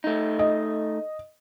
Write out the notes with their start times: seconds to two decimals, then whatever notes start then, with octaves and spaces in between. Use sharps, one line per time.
0.04 A3 D#4
0.39 D#5